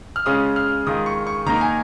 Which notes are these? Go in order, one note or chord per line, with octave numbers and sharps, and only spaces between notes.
F6
C#3 G#3 C#4 F4 D#6
F6
D#3 G#3 F4 D#6
C#6
C#6
D#3 A#3 D#4 A#5
G#5